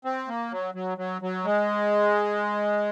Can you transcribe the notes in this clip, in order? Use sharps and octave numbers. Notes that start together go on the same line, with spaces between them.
C4
A#3
F#3
F#3
F#3
F#3
G#3